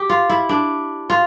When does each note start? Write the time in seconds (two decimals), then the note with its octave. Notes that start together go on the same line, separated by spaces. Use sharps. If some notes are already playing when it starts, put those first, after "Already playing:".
Already playing: G4
0.10 F4
0.29 E4
0.49 D4
1.10 F4